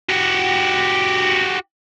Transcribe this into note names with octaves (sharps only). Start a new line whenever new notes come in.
F#4 G4